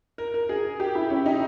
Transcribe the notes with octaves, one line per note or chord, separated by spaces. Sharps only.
A#4
A#4
G#4
G4
E4
C#4
D#4